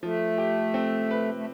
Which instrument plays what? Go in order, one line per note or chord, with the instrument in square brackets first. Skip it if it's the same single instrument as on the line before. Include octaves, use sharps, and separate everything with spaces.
[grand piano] F3 [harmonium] A3
[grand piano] G4
C4
B4
[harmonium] A3